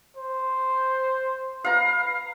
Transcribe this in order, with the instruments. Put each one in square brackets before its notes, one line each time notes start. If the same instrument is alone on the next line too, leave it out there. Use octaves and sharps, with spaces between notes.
[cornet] C5
[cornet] B4 [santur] F5 A#5